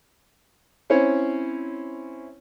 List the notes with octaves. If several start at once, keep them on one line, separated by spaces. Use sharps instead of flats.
C4 C#4 E4 C#5